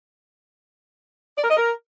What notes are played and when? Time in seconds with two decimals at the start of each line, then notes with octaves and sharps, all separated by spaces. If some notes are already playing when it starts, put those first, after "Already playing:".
1.37 D5
1.44 A#4
1.50 D#5
1.56 A#4